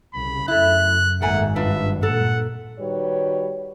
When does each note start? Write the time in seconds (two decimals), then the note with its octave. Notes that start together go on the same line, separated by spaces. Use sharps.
0.14 C2 C#3 B5
0.48 F#2 A3 E4 F#6
1.22 G#1 A3 A#3 F#5 G#5
1.56 G2 D4 F4 B4 E5
2.03 A#2 A4 F#5
2.79 D#3 G3 F#4 B4 C#5